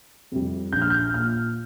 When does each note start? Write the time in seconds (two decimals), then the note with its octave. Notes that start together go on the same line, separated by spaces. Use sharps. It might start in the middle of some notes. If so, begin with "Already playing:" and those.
0.32 F2 C3 G3
0.73 A#1 G6
0.82 F6
0.90 G6
1.14 A#2 A#3 F6